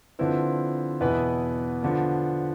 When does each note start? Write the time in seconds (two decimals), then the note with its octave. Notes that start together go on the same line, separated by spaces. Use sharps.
0.19 D3 F3 C4 E4 B4
1.01 E2 B2 B3 E4 B4
1.83 D3 F3 B3